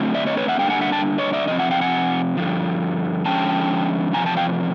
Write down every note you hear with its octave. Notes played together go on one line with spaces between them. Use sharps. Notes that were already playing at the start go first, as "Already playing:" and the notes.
Already playing: D3 F#3 A3 C4
D5 E5
C#5 D#5
B4 C#5
E5 F#5
D3 G3 A#3 D4 F5 G5
F#5 G#5
E5 F#5
G5 A5
C#5 D#5
D5 E5
C3 F3 C4 D#5
E5 F#5
F5 G5
F#5 G#5
G2 D3 F3
D3 F3 G#3 C#4 G5 A5
E2 C3 F3 G#5 A#5
G5 A5
F5 G5